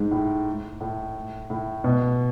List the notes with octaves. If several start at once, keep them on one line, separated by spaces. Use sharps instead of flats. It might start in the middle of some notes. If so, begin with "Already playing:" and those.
Already playing: G#2
A2
A2
A2
B2